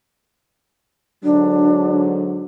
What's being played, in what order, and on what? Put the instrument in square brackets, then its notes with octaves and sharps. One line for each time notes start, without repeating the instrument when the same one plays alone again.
[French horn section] G#2 D3 F#3 [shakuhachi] D4